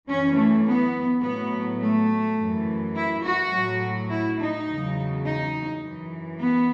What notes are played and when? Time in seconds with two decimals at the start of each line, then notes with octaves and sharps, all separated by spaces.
0.08 F#2 E3 C#4
0.36 A3
0.66 B3
1.22 A2 F#3 B3
1.80 A3
2.38 F#2 E3
2.96 E4
3.24 F#4
3.52 A2 F#3
4.10 E4
4.39 D#4
4.68 E2 C#3 F#3
5.25 D#4
5.83 F#2 E3
6.39 B3